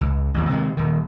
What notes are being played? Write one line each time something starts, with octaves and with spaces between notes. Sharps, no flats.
C#2
A1 D#2
C3 D#3 G3 G#3
D#1 D#3